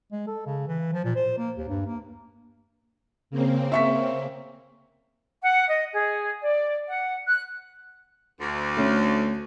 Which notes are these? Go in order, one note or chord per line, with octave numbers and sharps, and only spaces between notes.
G#3
A4
C#3
E3
F3
A#2
C5
A#3
D#2
G2
A#3
C#3 A#3 C4
E5 C#6 B6
F#5
D#5
G#4
D5
F#5
F#6
D2
A3 C#4